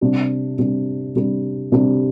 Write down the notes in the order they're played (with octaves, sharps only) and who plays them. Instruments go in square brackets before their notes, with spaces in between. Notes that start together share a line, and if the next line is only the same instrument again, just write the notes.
[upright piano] C3 G3 D4
C3 G3 D4
C3 G3 D4
C3 G3 D4